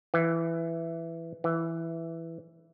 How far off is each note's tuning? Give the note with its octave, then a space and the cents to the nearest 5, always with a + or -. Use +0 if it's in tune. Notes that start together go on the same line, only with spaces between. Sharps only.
E3 +10
E3 +5